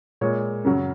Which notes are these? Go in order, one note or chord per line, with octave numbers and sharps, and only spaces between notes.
A#2 G#3 C#5
F#2 C#3 F#3